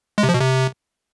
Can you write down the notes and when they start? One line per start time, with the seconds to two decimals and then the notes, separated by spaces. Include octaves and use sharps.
0.18 G#3
0.23 C3
0.29 F3
0.34 B2
0.40 C3